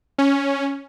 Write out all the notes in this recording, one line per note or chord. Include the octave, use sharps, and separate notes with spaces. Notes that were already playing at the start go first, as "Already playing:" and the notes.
C#4